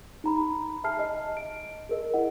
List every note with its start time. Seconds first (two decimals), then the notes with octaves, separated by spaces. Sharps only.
0.24 D#4 A#5 B5
0.84 E5 G#5 A5 F6 C7
0.99 D#5
1.37 D7
1.89 G#4 A#4 D#5
2.14 E4 D#5 F#5